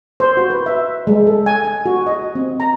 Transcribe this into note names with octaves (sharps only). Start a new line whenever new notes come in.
C5
F#4
B4
E5
G#3
A4
G#5
G#5
F#4
D#5
C4
A#5